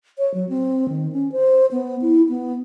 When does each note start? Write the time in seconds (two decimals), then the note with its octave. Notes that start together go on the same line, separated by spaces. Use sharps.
0.18 C#5
0.34 F#3
0.49 C4
0.89 D#3
1.12 C#4
1.32 C5
1.72 B3
2.02 E4
2.29 B3